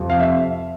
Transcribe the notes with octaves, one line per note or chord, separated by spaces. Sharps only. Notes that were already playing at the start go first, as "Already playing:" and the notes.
Already playing: F2 C3 F3
F5
E5